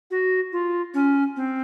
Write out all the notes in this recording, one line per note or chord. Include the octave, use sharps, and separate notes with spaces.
F#4
F4
C#4
C4